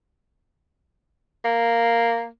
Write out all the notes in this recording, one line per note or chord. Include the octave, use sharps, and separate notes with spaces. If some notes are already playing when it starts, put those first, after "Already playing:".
A#3